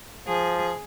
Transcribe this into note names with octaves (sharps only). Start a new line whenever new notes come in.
F3 G#4